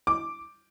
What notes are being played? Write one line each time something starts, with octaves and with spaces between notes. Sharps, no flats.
D6